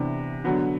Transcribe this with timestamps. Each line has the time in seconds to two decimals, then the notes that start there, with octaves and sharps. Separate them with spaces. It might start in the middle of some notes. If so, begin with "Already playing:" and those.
Already playing: C3 E3 B3 D4
0.44 D3 F#3 B3 F#4